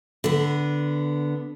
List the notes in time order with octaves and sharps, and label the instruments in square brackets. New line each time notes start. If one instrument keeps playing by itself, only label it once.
[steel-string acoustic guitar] D3 B3